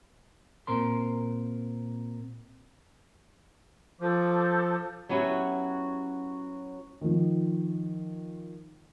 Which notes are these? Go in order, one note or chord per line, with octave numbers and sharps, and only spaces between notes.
A#2 C4 A#4 C6
F3 A4 D6 G6
F#3 B3 C#4 E4 F#4 G4
D#3 F3